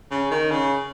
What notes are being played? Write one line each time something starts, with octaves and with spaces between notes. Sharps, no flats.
C#3
D#3
C#3